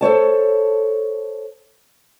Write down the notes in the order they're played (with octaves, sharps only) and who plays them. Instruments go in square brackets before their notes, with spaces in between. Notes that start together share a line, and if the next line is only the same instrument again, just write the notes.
[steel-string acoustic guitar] A4 C5 C#5 A5